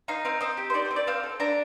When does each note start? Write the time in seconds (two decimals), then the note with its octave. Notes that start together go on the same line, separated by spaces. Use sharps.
0.08 D#4 F5
0.25 C4 F5
0.41 C4 D#5
0.57 G4
0.70 C5
0.74 D#4 D5
0.85 C5
0.91 C4
0.96 D5
1.07 C4 F5
1.23 A4
1.40 D4 A#5